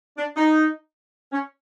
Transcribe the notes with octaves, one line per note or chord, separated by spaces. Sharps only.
D4
D#4
C#4